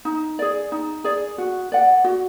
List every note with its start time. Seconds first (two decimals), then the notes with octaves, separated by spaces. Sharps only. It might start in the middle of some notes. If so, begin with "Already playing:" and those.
0.05 D#4
0.39 G#4 D5
0.72 D#4
1.04 G#4 D5
1.38 F#4
1.72 D5 F#5
2.04 F#4